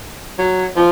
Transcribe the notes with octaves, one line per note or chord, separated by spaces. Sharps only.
F#3
F3